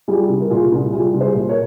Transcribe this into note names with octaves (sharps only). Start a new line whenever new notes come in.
G3 F4 G#4
C2
A#4
A#2 F4 G#4
C2
G3 F4 G#4
C2
G#4 C5
A#2
A#4 C#5